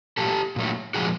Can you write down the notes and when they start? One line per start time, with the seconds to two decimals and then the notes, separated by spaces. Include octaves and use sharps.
0.17 A#2 F#3 A3 G4 A4
0.56 A#2 F#3 A3
0.94 A#2 F3 G#3 F#4 G#4